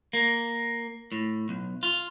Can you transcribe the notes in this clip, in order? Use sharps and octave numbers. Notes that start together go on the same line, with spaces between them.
A#3
A2
B1
F4